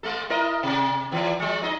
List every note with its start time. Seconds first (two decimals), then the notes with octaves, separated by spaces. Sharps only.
0.03 G#3 A3 A4
0.30 E4 A#4 D#5
0.63 C3
1.11 E2 E3
1.39 F3 G#3
1.63 D#4 D#5